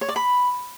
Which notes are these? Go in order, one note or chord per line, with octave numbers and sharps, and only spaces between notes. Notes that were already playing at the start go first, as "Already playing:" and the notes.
C#5
D5
B5